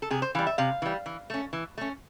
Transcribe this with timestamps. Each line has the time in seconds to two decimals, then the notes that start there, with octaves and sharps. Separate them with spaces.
0.02 A4
0.10 C3 G#4
0.22 C5
0.35 E3 F5
0.39 G3
0.47 E5
0.58 C3 F5
0.82 E3 G3
1.06 E3
1.30 A3 C#4
1.53 E3
1.78 A3 C#4